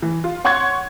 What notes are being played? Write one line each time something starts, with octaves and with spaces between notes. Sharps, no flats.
E3
F4
C#5 F#5 C6 C#6 F#6 G#6